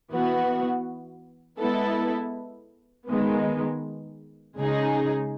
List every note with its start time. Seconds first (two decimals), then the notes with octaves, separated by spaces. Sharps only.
0.11 E3 B3 F#4
1.59 G#3 B3 E4 A4
3.08 D#3 G#3 B3
4.57 C#3 G#3 D#4 G#4